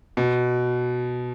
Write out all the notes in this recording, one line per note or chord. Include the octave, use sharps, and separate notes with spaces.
B2